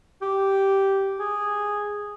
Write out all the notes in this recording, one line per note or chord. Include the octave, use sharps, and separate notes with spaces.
G4
G#4